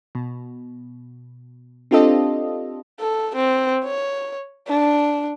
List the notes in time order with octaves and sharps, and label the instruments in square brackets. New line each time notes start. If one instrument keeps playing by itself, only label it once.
[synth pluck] B2
C4 D4 F4 G4 A4 D#5
[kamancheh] A4
C4
C#5
D4